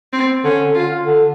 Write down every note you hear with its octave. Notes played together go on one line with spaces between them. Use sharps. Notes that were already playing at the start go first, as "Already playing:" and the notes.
C4
D3 C#4
D3
F4
D3